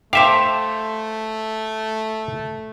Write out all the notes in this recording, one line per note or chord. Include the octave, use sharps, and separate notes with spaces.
A3 G4 A4 C5 E5 F5